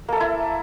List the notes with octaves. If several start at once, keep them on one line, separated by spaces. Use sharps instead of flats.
A#3 E4 A4 E5